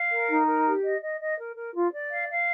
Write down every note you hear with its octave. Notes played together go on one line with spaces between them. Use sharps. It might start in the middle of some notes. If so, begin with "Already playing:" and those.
Already playing: F5
A#4
D#4
A#4
G4
D#5
D#5
D#5
A#4
A#4
F4
D5
F5
F5